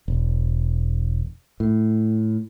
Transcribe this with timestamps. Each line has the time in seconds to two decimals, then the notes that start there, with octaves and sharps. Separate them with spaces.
0.08 E1
1.60 A2